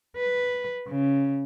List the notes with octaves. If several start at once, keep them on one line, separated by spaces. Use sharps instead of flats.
B4
C#3